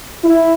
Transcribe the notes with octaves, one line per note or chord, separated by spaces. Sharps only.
E4